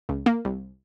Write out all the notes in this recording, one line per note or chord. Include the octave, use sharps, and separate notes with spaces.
C#2
A#3
C2